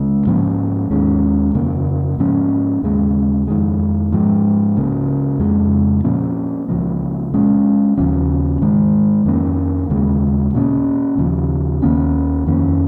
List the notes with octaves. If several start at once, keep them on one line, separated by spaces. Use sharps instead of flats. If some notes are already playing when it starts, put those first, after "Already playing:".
Already playing: C#2 C#3 G#3
G#2 F3 A#3 C#4
D#2 D#3 G#3 C#4
F2 C#3 A#3
G#2 F3 A#3 C#4
D#2 C#3 G#3
F2 D#3 G#3
G#2 F3 G#3
C#2 C#3 A#3
F2 C#3 F3 G#3
A#2 F3 A#3 C#4
C#2 C#3 F3 A#3
A#2 G#3 C#4
D#2 C#3 F3 C#4
G#2 D#3 G#3
F2 D#3 A#3 C#4
D#2 C#3 G#3
A#2 A#3 C#4
D#2 C#3 F3
D#2 D#3 A#3 C#4
F2 D#3 A#3 C#4